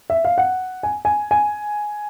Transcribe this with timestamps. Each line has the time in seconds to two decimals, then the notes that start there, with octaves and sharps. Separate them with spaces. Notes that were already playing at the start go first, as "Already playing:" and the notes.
0.10 E5
0.25 F5
0.38 F#5
0.83 G#5
1.05 G#5
1.31 G#5